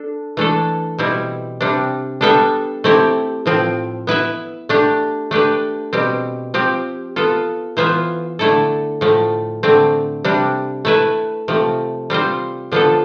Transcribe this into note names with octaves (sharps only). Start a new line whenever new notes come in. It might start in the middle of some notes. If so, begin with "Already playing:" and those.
Already playing: D4 A4
E3 A3 D4 A4
B2 G3 C4 E4
C3 G3 D4
G3 B3 D4 A4 E5
A3 C4 E4 G4
A2 F3 C4
B3 E4 B4 E5
A3 D4 G4
A3 D4 G4 B4
B2 G3 C4
F3 C4 G4
B3 F4 A4
E3 B3 F4 C5 E5
D3 A3 E4 A4
A2 F3 A3
D3 A3 C4
C3 G3 D4
A3 E4 B4 E5
C3 F3 A3
G3 C4 F4 C5
D3 F3 B3 F4 A4